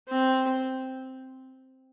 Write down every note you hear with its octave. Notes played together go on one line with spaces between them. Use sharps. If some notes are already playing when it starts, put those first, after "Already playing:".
C4